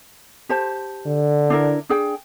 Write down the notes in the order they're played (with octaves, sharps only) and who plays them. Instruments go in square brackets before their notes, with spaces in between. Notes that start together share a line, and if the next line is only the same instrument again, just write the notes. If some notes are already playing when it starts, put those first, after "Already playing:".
[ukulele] G4 C5 A5
[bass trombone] D3
[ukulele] D4 E4 A#4
D4 G#4 G5